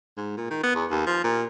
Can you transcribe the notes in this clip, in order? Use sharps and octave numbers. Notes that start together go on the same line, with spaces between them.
G#2
A#2
D#3
B3
E2
D#2
F3
A#2